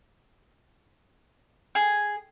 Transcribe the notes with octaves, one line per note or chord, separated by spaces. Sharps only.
G#4